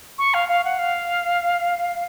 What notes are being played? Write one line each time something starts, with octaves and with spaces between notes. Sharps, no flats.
C#6
F5
F5
F#5
F5